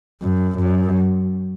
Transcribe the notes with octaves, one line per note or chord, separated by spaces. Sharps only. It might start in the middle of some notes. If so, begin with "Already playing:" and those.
F#2
F#2